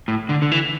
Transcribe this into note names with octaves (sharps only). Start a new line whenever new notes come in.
A2
D3
D3
E3